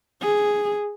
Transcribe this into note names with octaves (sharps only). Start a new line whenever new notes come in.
G#4